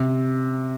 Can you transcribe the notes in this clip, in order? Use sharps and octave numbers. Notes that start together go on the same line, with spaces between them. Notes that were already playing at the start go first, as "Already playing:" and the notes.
Already playing: C3